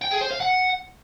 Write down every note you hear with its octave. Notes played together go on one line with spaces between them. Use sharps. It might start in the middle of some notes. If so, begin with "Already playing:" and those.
G5
G#4
C5
F5
F#5